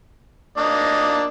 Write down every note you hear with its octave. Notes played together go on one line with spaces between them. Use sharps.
A#3 D4 D#5